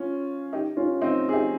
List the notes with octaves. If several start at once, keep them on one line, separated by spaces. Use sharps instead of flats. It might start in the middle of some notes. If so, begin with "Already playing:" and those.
Already playing: C#4 F4
D#4 G4
C#4 F4
C4 D#4
G#4
D#4 G4